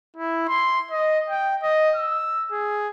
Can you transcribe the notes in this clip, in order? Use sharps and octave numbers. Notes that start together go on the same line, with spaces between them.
E4
C6
D#5
G5
D#5
E6
G#4